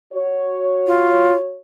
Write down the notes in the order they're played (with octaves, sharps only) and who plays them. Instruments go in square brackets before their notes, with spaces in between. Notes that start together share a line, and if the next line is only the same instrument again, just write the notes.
[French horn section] F#4 C#5
[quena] F4